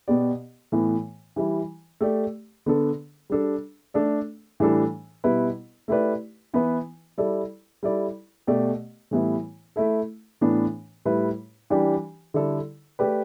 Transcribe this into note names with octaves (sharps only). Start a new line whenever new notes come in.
B2 B3 G4 D5
A2 E3 B3
E3 G3 E4
A3 G4 D5
D3 B3 D4 A4
G3 D4 A4
A3 D4 A4 D5
A2 E3 G3 D4 A4
B2 G3 E4 B4
A3 E4 G4 B4 D5
E3 B3 E4 B4
G3 E4 A4 D5
G3 E4 A4 D5
B2 A3 G4 D5
A2 E3 G3 B3 E4
A3 E4 A4
A2 E3 B3 D4
A2 G3 E4 B4
E3 G3 D4 G4 D5
D3 G3 E4 A4 D5
A3 G4 B4 D5